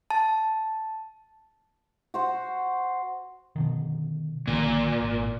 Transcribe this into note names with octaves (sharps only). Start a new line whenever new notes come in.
A5
F#4 C5 F#5
B2 D3 D#3
A#1 A#2 D3 D#3
G#1